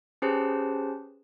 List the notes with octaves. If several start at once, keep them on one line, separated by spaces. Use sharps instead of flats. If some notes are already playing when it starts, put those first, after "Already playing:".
C#4 G4 G#4 B4 C5 A5